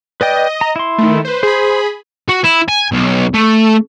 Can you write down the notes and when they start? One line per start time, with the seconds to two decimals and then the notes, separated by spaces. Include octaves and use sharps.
0.21 B4 D5 D#5 G5
0.61 A#5
0.76 E4 C6
0.98 D#3 A3
1.25 B4 C5
1.43 G#4 C5 B5
2.28 F#4
2.44 E4
2.68 G#5
2.92 B1
3.34 A3